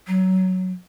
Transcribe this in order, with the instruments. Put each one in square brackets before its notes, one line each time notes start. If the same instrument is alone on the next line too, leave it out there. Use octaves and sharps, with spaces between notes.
[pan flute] F#3